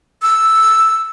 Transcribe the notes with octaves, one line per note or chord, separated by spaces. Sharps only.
E6